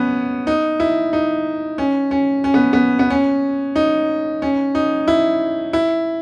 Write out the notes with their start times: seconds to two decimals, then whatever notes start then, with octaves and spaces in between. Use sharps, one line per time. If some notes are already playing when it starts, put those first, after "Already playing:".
Already playing: B3 C#4
0.47 D#4
0.80 E4
1.13 D#4
1.78 C#4
2.11 C#4
2.44 C#4
2.54 B3
2.73 B3
2.99 B3
3.10 C#4
3.76 D#4
4.42 C#4
4.75 D#4
5.08 E4
5.73 E4